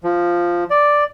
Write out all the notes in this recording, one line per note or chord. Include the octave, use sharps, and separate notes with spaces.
F3
D5